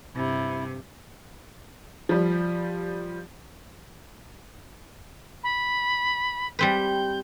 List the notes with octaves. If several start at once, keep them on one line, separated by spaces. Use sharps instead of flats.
G2 C3 E4
F3 G3
B5
G3 C4 B4 G6